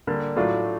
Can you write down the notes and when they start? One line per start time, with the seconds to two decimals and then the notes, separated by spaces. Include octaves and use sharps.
0.07 D3 G3 A#3
0.36 A2 F#3 A3 D4 F4